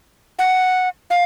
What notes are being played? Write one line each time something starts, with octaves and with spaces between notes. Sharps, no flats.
F#5
F5